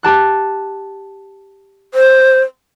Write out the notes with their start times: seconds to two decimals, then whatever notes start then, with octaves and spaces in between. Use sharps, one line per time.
0.03 G4 A5 F#6
1.94 C5